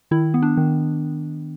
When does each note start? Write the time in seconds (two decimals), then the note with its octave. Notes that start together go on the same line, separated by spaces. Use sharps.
0.11 D#3 E4
0.34 B3
0.42 D4
0.57 D#3